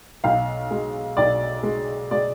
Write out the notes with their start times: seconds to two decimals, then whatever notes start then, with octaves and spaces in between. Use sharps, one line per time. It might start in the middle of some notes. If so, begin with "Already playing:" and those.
0.24 B1 F5
0.71 G#3
1.17 B1 D5
1.63 G#3
2.11 G#3 D5